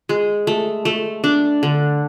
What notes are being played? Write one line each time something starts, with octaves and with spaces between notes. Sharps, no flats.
G#3
A3
A3
D4
D3